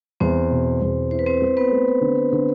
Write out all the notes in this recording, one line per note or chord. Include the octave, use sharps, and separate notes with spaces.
E2 C4 C5
B2
E2
E4 C5
B4
C4 C5
C4
B3 B4
A3
D3
D3